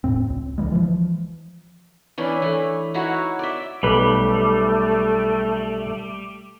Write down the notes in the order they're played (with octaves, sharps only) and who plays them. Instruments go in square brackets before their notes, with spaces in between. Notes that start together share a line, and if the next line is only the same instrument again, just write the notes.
[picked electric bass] E1 B1 A2 C4
C#2
D2 E3 G3 G#3
E3 F3
[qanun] E3 C#4 D4 E4
E3 A3
D#4 E4 F#4 C#5
D5 E5
[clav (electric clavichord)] B1 B4 [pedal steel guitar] G3 [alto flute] A3